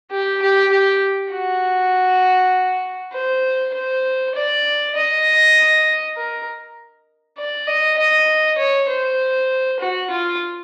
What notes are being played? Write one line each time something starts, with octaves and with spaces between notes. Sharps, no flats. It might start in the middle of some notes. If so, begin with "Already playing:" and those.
G4
G4
G4
F#4
C5
C5
D5
D#5
A#4
D5
D#5
D#5
C#5
C5
F#4
F4